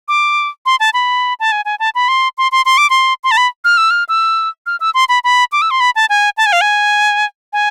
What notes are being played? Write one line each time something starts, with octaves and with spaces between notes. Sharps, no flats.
D6
C6
A5
B5
A5
G#5
G#5
A5
B5
C6
C6
C6
C6
D6
C6
C6
A5
B5
F6
E6
F6
E6
F6
E6
C6
B5
B5
D6
E6
C6
B5
A5
G#5
A5
G#5
F5
G#5
G#5